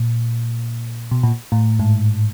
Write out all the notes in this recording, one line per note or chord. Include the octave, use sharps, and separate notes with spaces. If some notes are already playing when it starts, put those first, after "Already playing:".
Already playing: A#2
B2
A#2
A2
G#2